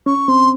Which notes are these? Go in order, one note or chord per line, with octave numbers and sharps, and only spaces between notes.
C#4 C#6
C4 C6